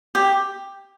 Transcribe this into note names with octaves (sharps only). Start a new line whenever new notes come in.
G4